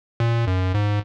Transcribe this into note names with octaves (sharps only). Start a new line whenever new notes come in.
A#2
F#2
G#2